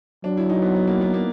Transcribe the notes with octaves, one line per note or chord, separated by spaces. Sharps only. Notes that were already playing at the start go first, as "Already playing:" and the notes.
F#3 D4
E4
D#4
B3
B3
A#3
B3
A#3